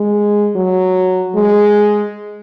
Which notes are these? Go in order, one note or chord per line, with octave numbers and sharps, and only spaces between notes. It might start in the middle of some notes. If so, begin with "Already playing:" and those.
Already playing: G#3
F#3
G#3